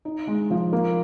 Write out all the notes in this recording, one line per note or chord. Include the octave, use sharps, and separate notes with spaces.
D#4
G#3
F3
A#3